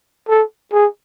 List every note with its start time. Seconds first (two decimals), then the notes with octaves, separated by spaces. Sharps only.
0.29 A4
0.73 G#4